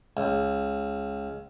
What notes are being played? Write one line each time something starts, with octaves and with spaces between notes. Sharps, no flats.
C#2